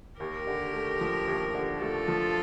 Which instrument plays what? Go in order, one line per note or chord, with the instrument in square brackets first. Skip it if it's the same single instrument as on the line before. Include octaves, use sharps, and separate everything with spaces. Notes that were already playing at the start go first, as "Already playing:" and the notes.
[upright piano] D#2 [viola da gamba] G4 A#4
[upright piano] D3
A3
F3
D#2
D3
[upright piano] A3 [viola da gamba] F4 A4
[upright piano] F3